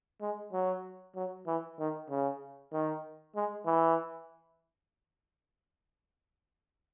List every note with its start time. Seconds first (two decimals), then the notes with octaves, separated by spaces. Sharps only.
0.21 G#3
0.53 F#3
1.16 F#3
1.47 E3
1.79 D#3
2.09 C#3
2.73 D#3
3.36 G#3
3.66 E3